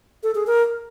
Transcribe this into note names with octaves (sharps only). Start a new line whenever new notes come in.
A4
G#4
A#4